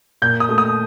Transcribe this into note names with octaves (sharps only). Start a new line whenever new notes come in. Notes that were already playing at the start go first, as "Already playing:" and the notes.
A#2 G6
D#6
A3
D#6